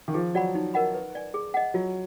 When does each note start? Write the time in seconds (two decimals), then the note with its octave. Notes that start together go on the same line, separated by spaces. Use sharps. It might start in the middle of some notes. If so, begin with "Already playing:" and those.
0.08 D#3
0.14 F3 G#4
0.35 F#3 D5 F#5 B5
0.55 D#4
0.74 A#4 D#5 F#5 B5
0.94 B4
1.15 D5 G#5
1.34 G#4
1.54 D#5 F#5
1.74 F#3 F4